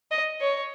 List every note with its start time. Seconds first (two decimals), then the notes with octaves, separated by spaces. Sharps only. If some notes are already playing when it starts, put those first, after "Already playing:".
0.11 D#5
0.41 C#5